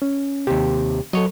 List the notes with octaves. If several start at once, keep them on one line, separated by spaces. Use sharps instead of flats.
C#4
D#2 C3 G4
F#3 A4 C#5 D#5